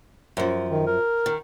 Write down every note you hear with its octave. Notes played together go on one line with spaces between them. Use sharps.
F#2 F3
D#3
A#4
D#3